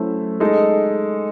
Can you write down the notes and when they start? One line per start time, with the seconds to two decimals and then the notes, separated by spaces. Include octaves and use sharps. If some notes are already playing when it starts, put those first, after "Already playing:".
Already playing: F#3 A3 C#4 E4 C5
0.40 G#3 D#4 A4